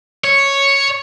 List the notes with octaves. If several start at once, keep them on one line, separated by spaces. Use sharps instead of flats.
C#5